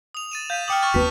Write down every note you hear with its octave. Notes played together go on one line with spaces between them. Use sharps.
D#6 F7
A6 D#7 E7
F5 G6 B6 D#7
G5 D6 D#6 F6 C#7 F#7
C#6 F6 A6
F1 D#2 B3 F#4 B4 A5 B6